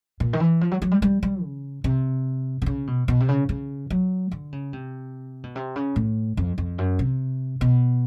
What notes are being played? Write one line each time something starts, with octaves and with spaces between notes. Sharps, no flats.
A#2
D#3
E3
F3
F#3
F#3
G3
G3
G3
C#3
C3
C3
C#3
B2
B2
C3
C#3
C#3
F#3
D3
C#3
C3
B2
C3
C#3
A2
F2
F2
F#2
C3
B2